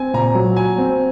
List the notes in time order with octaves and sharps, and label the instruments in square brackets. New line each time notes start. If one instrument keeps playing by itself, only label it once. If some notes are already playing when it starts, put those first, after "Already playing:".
Already playing: [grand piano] C4 [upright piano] G#5
[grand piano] A#2 [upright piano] A#5
[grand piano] F#3
[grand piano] F#4 [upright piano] G#5
[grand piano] C4